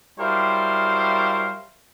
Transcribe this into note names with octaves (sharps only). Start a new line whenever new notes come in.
F#3 G3 E4 A#4 C5 F5